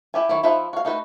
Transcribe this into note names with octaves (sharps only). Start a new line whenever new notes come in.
E4 G4 G#5
D#3 F#3 E4
F3 D#4 E4 B4 E5
F#4 F5
A3 D#4 F#4 B4